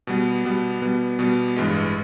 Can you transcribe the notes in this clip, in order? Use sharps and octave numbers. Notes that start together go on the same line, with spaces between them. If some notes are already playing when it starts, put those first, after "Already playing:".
B2 G3 B3
B2 G3 B3
B2 G3 B3
B2 G3 B3
A1 G2 E3 G#3